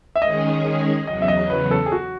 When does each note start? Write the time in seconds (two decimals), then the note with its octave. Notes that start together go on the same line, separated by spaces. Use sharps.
0.16 E5
0.22 D#3 G#3 C#4 G#4 D#5
1.07 E2 C#3 F#3 D#5
1.22 E5
1.28 D#5
1.50 B4
1.71 A4
1.86 G#4
1.92 F#4